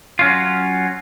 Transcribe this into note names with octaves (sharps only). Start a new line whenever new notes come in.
F#3 C#4 F4